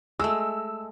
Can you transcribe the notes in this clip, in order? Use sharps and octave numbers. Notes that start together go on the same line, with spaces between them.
G#3 A3 E6